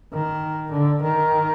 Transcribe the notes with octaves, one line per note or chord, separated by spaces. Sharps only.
D#3
D3
D#3